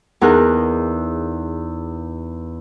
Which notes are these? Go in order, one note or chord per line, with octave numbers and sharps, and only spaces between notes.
E2 D#4 G#4 A#4 F#6